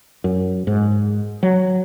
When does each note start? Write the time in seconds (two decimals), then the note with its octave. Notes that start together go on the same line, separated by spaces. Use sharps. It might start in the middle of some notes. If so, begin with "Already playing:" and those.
0.24 F#2
0.67 G#2
1.43 F#3